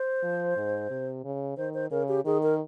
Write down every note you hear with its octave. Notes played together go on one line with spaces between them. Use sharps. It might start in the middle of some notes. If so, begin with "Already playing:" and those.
Already playing: C5
F3
G#2
C3
C#3
D#3 C5
C5
C#3 A#4
G4
D#3 G#4
A#4